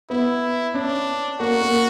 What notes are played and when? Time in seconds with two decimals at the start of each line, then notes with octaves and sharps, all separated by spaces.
0.10 B3 E4
0.74 C#4 D4
1.39 A#3 F#4
1.62 A#3